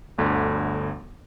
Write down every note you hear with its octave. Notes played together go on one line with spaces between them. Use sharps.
G1 D2 D3